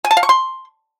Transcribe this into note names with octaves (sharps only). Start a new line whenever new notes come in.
G#5
A5
F5
C#6
C6